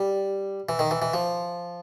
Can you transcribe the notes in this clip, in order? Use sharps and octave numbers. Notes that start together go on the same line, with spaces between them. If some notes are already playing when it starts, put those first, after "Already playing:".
Already playing: G3
E3
D#3
E3
E3
F3